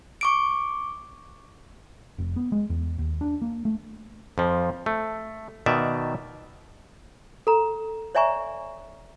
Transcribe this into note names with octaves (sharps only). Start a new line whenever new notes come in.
C#6 D6 D7
F1
B3
G#3
E2
D#2
D4
A#3
A3
F2 F3
A3
B2 D#3 D5 E5
A4 A#5
C#5 D5 E5 G#5 A#5 C#6